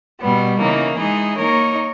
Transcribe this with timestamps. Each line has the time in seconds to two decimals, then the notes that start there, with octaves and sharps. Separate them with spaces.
0.20 B2 G3 B3
0.59 C#3 E3 A#3 D#4
0.98 E3 G#3 D#4 G#4
1.37 A#3 D#4 A#4 C#5